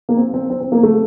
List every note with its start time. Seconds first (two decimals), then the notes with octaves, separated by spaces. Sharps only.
0.09 A#3
0.17 C4
0.34 C4
0.50 C4
0.61 C4
0.72 A#3
0.83 A3